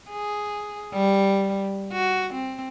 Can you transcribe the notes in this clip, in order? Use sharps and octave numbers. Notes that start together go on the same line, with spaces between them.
G#4
G3
F#4
C4